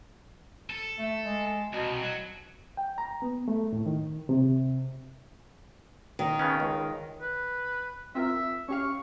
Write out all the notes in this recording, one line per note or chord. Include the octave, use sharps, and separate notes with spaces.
A4
A3
G#3
C2 B2
F#3
G5
A#5
B3
A3
A2
D#3
C3
D#3
C#3 B3 C#4
C#2
B4
C4 F4 A#4 E5
C#4 G4 F5 C#6